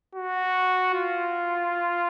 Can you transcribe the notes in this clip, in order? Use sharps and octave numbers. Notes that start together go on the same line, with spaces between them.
F#4
F4